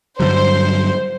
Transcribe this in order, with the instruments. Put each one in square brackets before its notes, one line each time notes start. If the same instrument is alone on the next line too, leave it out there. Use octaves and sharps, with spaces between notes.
[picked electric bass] G2 D3 F#3 [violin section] C5